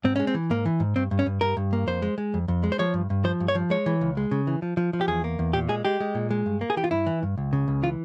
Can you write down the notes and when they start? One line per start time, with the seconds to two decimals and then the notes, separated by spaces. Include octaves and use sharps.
0.04 G#2 C4
0.16 G#3 C#4
0.27 C4
0.34 E3
0.50 G#2 A#3
0.66 E3
0.80 G#2
0.96 G2 C4
1.11 G2
1.19 C#4
1.26 G2
1.41 G2 A#4
1.57 G2
1.73 A#3
1.87 F2 C5
2.02 G#3
2.18 G#3
2.34 F2
2.48 F2
2.64 G#3
2.72 C5
2.79 F3 C#5
2.94 G2
3.10 G2
3.24 F3 C5
3.40 G2
3.48 C#5
3.55 F3
3.70 G#3 C#5
3.86 E3
4.01 C#2
4.17 G#3
4.31 C#3
4.47 E3
4.62 F3
4.77 F3
4.93 F3
5.01 G4
5.08 E2 G#4
5.24 A#3
5.39 E2
5.53 A#2 G4
5.69 G#3 G#4
5.85 G#3 G4
6.00 G#3
6.15 A#2
6.31 G#3
6.46 G2
6.61 A#3
6.70 G#4
6.77 E3 G4
6.84 F4
6.91 G2 E4
7.06 E3
7.23 G2
7.38 C#2
7.53 C#3
7.68 C#2
7.83 E3 F4